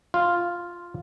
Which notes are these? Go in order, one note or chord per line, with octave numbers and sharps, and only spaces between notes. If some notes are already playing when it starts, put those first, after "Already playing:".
F4